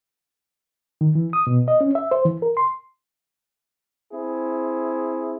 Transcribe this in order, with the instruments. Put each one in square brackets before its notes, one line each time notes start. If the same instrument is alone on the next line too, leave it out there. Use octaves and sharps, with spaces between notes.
[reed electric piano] D#3
E3
D#6
B2
D#5
C#4
E5
C5
E3
A#4
C6
[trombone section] C4 E4 G#4